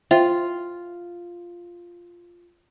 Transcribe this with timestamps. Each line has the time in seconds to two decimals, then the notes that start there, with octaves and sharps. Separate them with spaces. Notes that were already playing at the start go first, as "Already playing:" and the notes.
0.11 F4 C5 E5 G5